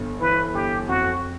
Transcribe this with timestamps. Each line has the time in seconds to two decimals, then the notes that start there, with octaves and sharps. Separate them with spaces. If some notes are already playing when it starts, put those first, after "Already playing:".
Already playing: G1 G2
0.20 E3 B4
0.54 G1 G4
0.88 F2 F#4